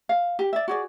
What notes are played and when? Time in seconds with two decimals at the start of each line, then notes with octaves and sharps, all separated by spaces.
0.09 F5
0.39 G4
0.53 D5 E5
0.68 F#4 G#4 D5